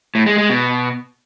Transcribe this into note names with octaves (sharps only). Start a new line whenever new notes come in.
A2
G#3
G#3
B2